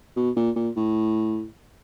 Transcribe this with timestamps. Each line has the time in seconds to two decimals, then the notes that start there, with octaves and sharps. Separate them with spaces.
0.16 B2
0.36 A#2
0.56 A#2
0.76 A2